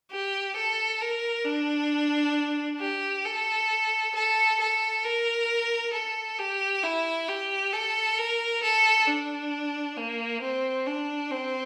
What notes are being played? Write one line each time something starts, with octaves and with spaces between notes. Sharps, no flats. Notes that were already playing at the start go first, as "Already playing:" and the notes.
G4
A4
A#4
D4
G4
A4
A4
A4
A#4
A4
G4
E4
G4
A4
A#4
A4
D4
A#3
C4
D4
C4